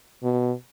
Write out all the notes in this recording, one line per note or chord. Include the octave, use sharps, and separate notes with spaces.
B2